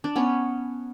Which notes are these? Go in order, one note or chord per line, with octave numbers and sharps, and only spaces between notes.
D4
B3 C#4